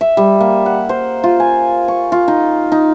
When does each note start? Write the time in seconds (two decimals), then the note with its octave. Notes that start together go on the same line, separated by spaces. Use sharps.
0.01 E5
0.17 G3
0.41 A#3
0.66 F#5
0.89 C5
1.24 F4
1.40 G#5
1.88 C#6
2.12 F4
2.28 D#4
2.72 D#4